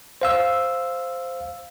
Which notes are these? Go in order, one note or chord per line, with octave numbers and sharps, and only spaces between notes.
C5 F5 E6